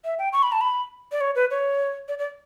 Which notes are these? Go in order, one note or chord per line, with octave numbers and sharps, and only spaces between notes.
E5
G5
C#6
B5
A5
B5
D5
C#5
B4
C#5
D5
D5